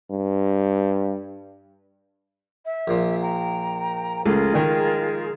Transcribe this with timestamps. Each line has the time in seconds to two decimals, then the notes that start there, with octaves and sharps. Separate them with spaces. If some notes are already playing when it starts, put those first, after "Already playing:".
0.11 G2
2.66 E5
2.87 A#1 A#2
3.21 G5 A#5
4.26 C#2 A3 F4 G#4 A#4
4.54 D#3 G#3